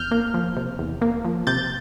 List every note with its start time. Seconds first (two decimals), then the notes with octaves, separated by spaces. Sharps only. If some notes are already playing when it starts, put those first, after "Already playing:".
Already playing: E2 F6 G6
0.11 A#3
0.34 F3
0.56 C3
0.79 E2
1.01 A#3
1.25 F3
1.47 C3 G6 A6